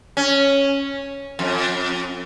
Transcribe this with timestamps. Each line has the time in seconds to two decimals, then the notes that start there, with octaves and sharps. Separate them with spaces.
0.17 C#4
1.39 F2